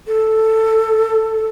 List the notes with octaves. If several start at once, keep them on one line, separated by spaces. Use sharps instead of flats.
A4